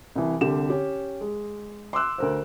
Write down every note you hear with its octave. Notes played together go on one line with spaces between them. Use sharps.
C2 E3
C2 D3 G4 E7
C#4 G4
G#3
C6 D6 E6 F#6
D2 A#4 C5